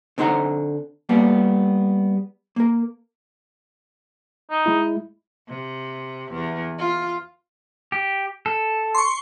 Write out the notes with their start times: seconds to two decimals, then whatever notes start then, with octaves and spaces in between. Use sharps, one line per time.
0.18 D3 C4 D#4 C5 F#5 A#5
1.09 G3 A#3 B3
2.56 A#3 A#4
4.51 D#4
4.66 G#3 E4
5.48 C3
6.32 E2
6.78 F4
7.92 G4
8.46 A4
8.95 C6 C#6